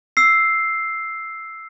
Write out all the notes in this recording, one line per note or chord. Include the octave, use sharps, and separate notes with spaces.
E6 C7